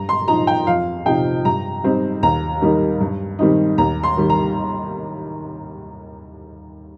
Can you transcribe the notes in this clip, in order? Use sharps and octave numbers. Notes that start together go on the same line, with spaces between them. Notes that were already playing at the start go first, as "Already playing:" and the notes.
Already playing: G2 A#5
C6
F3 D#4 A#5
G5
F2 F5
C3 F3 D#4 G5
G2 A#5
G3 C4 D#4
D#2 A#5
D#3 G3 A#3 D#4
G2
D#3 G3 C4 D#4
D#2 A#5
C6
D#3 G3
A#5